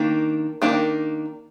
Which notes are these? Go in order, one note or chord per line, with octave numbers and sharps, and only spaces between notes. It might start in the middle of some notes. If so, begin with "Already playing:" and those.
Already playing: D#3 A#3 D4
D#3 A#3 D4